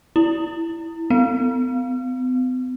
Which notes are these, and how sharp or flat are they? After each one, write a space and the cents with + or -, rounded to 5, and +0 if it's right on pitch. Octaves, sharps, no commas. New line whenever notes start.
E4 +5
B3 +45